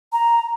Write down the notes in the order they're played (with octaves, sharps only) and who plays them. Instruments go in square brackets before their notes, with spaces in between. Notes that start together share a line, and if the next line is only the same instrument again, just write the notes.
[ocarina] A#5